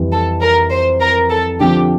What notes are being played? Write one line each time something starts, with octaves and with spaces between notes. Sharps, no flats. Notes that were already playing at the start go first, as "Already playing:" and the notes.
Already playing: F2 E3 G3
A4
A#4
C5
A#4
A4
D3 F3 C4 G4